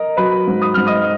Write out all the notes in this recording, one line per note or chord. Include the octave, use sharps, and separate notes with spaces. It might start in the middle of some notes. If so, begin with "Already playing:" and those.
Already playing: A#4 D#5 A#5
F#3 B4 B5
G#2
D#6
G#2 F6
D#5 D#6